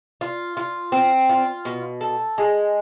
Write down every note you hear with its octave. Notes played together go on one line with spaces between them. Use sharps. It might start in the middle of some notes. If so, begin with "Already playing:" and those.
F4
F4
C4
F4
B2
A4
G#3